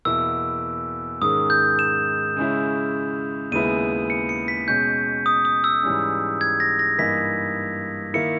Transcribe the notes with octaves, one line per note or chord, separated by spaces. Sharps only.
E2 B2 A#3 E4 E6
G#2 D#3 G#3 C#4 D#6
G6
E7
C#3 G#3 C#4 E4
D#2 C#3 G#3 B3 E4 D#7
C#7
C#7
B6
B2 G#3 C#4 G6
D#6
D#6
E6
G#2 E3 G3 C#4
G#6
A#6
A#6
G2 E3 A#3 D#4 B6
D#3 A#3 E4 C#7